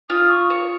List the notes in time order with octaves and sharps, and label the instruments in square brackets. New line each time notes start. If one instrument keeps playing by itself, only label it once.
[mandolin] F4 [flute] D#6
[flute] C#6
[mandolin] C#5